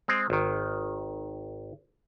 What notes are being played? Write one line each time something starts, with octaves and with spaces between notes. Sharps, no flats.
G#3 C4
G#1 D#3